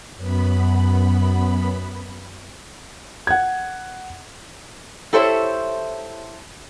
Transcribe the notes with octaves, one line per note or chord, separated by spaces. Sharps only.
F#2 B3 B5
F#5 G#6
E4 G4 A4 C5 C#5 E5